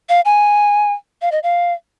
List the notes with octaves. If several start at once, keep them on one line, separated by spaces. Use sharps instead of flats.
F5
G#5
F5
D#5
F5